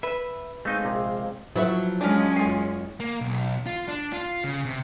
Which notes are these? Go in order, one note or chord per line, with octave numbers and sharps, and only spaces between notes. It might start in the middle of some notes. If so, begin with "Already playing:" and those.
B4 E5
G#3 A3 C4 D#4 D#5 F5
A#1 C3
F3 F#3 E4 A4 B4 E5
G#3 C#4 D4 F4 G#5 F6
F#1 F4 G#5 C7
A#3
B1
F4
D4
F4
C#3
C3